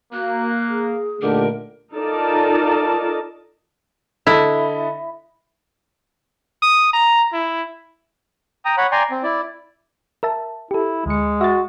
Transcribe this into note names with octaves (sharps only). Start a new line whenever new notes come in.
A#3 F#4 F#6
G#4
A#2 D3 A3 D4 D#4 G4 A#4
D#4 F4 A4 A#4 D5 A5
D3 E4 A4 D#5
D#6
A#5
E4
G5 A#5 D#6
C#5 F#5 B5
D5 G5 G#5 A#5 C6
C4
E4 D5
A#4 E5 A5
E4 G4 A4
D2 G#3 C#7
F#4 E5 A6